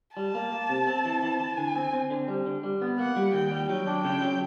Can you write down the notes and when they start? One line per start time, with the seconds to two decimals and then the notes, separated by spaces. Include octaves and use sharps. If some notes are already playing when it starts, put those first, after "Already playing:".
0.17 G3 A5
0.35 A#3
0.52 A#3
0.69 C3
0.87 C4
1.05 E3
1.23 E3
1.40 E3
1.57 D3 G#5
1.76 C4
1.93 C4
2.10 D3
2.28 G3
2.46 D3
2.63 G3
2.82 B3
2.99 A#3 F#5
3.17 G3
3.34 D#2 G5
3.51 G3
3.69 F#3 G5
3.87 D4
4.04 C#3 G5
4.21 F#3